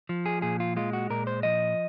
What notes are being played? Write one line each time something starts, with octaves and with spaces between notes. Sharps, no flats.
F3
G#4
A#2 G#4
F4
G#3 F4
F#4
A#2 A#4
C5
F3 D#5